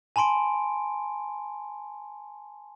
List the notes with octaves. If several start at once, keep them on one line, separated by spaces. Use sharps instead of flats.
G#5 A5 B5 C6 D7